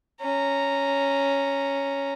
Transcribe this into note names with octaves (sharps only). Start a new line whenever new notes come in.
C#4 A#5